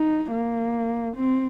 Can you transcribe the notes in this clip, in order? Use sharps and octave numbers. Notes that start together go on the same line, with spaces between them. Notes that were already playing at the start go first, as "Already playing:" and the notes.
Already playing: D#4
A#3
C4